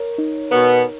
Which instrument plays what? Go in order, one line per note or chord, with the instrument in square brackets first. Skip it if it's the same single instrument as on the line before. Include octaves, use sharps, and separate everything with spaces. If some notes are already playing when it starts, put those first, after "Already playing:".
Already playing: [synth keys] A#4 C#5
D#4
[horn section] B2 B3 [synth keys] A#4